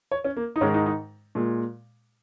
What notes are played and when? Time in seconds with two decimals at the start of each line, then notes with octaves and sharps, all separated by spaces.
0.12 C#5
0.24 C#4
0.36 A#3
0.56 D#4
0.61 G#2 D#3 G#3 C#4
0.74 D#4
0.86 D#4
1.35 A#2 G#3